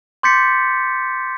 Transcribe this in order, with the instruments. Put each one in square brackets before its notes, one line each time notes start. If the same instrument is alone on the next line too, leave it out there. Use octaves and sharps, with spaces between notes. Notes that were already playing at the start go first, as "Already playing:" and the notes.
[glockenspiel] C6 D6 G6 A6 B6 C#7